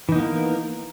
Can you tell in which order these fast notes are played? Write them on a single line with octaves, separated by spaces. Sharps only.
E3 D#4 B3 A#3 A#4